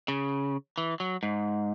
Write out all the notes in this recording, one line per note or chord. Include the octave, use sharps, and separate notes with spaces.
C#3
E3
F#3
G#2